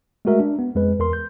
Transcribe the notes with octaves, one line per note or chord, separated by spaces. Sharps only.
G#3 A3 F#4 A#4 E5
D4
B3
F2 G#3 B4
E2 A#4 C6
G6